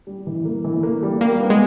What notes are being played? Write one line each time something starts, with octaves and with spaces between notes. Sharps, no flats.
G3
E3
A#3
E3
A#3
G3
G3 A#3
B3
G#3